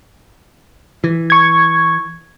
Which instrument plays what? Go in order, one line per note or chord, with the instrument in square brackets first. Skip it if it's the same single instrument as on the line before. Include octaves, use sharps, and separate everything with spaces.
[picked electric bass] E3
[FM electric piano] C#6 G#6